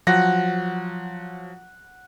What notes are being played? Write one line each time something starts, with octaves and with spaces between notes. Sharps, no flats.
F3 F#3 F#5 A#6